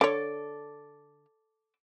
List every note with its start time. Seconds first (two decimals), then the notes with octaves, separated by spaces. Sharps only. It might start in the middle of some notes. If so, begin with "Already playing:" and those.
0.01 D3 A4 C#5 D5